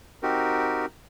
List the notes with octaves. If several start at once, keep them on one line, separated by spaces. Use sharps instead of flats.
C4 D#4 F#4 G4 A#4